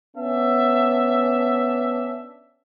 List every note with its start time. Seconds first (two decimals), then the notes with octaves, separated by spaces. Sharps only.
0.17 B3 C#4 D4 E5 A5